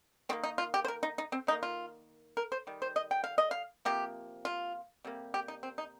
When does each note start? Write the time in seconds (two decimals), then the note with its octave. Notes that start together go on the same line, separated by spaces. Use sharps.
0.29 D#3 C4
0.33 A#3
0.44 D#4
0.58 F4
0.74 G4
0.85 C5
0.88 A#4
1.03 D#4
1.18 D#4
1.32 C4
1.47 D#3 D#4
1.51 A#3
1.63 F4
2.37 A#4
2.52 C5
2.67 D#3 G3
2.82 C5
2.96 D#5
3.11 G5
3.24 F5
3.38 D#5
3.51 F5
3.85 C3 F3 A#3 G4
4.45 F4
5.05 C3 G3 A#3
5.34 G4
5.48 D#4
5.63 C4
5.78 D#4